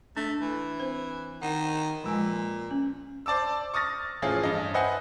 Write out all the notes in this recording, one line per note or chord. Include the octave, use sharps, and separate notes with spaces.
A3 D4
E3
C4 C5
D#3 F#5
A#2 F3 G#3 G#5
C#4
C5 D5 A5 D6 E6
C#6 D#6 F6 A6 A#6
A2 E3 F3 C#4 F4 G#4
G2 D#5
B4 C5 D#5 E5 F#5 G#5